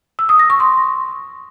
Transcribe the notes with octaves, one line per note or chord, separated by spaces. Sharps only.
E6
D#6
A#6
C#6
C6